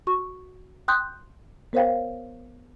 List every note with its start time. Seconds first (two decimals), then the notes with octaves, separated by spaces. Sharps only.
0.07 F#4 C#6
0.88 G5 C6 D#6 F#6 G6
1.73 B3 A#4 C5 C#5 F5 G5